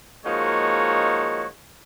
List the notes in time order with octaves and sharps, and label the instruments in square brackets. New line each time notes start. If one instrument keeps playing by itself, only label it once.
[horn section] F3 G#3 A#3 D#4 F#4 C#5